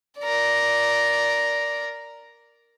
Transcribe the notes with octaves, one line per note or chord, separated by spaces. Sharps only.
A#4 D5